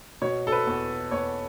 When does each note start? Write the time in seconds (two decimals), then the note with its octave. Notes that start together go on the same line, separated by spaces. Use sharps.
0.22 B2 C#5
0.47 A4
0.52 B4
0.67 E2
1.11 E2 C#5